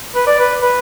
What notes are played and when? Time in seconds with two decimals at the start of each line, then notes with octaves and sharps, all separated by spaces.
0.15 B4
0.27 D5
0.39 B4
0.62 B4